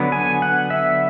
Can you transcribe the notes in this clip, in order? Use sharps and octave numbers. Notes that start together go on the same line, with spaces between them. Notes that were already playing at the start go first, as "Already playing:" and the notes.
Already playing: D3 F#3 B3
G#5
F#5
E5